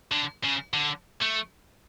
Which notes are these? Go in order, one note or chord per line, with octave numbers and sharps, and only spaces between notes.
D3
C#3
D3
A3